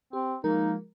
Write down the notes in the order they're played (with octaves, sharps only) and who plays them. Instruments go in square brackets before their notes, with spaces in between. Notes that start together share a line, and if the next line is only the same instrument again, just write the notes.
[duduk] C4 [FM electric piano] G4
[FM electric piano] F3 G#3 A#4 [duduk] A#3 [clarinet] D#4